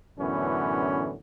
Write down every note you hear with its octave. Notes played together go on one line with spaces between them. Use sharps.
F#2 A2 D3 E3 B3 C#4